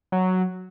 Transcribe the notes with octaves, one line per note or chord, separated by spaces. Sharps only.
F#3